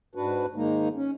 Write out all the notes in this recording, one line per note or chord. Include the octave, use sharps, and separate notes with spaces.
G#2 D4 F#4 B4
G#2 D#3 G#3 A#3 D#4
C#4